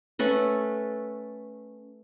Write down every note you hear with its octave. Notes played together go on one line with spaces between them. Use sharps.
A3 C#4 A4 B4